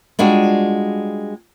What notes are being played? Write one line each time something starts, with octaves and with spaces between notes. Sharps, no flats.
G3 G#3 D4 F4 F#4